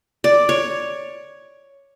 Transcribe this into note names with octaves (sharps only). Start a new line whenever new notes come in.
D5
C#5